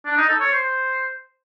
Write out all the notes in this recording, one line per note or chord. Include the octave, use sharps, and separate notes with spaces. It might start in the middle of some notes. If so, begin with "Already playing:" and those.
D4
D#4
A4
C#5
C5